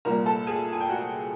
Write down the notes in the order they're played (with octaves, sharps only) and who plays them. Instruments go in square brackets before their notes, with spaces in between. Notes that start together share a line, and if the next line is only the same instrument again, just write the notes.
[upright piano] C2 A#2 G3 A#3 A#4 A#5
A4 A5
G#4 G#5
G#5
G5
F#4 F#5